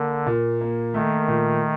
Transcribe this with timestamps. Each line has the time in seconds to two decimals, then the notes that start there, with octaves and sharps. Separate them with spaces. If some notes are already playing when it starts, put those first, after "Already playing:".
Already playing: D3 A#3
0.26 A#2
0.61 A#3
0.94 D#3 A3
1.28 A#2